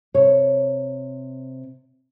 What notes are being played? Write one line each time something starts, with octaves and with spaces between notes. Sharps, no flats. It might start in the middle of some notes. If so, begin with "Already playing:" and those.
C3 C#5